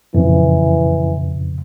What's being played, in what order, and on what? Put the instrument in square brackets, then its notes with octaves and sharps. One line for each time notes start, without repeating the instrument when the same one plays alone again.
[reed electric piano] F2 A#2 C#3 [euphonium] E3